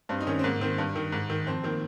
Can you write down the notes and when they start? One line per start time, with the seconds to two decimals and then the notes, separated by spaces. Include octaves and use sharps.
0.09 G2 C4
0.20 D#4
0.27 D#3 C#4
0.39 C4
0.44 G#2 A#3
0.61 D#3 C4
0.78 G2
0.96 D#3
1.12 G#2
1.30 D#3
1.47 F2 C4
1.63 D#3 A#3